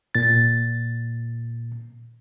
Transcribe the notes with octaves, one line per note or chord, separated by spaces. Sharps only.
A#2 A6